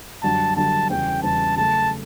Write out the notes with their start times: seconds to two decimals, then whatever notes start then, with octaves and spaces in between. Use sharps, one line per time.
0.23 F#2 D3 G3 D4 F#4 A5
0.57 F#2 D3 G3 D4 F#4 A5
0.90 E2 C#3 G3 C#4 F#4 G5
1.23 E2 C#3 G3 C#4 F#4 A5
1.57 C#3 F#3 A3 A5